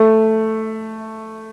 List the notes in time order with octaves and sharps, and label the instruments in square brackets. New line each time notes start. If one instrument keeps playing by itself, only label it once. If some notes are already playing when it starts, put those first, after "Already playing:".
Already playing: [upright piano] A3